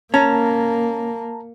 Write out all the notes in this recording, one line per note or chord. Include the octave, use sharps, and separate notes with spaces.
A#3 C#4 A5 A#5